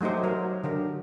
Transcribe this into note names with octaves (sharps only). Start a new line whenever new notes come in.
F#3 A3 D#4 G4 C5
F#3 A#4
D3 G4 A#4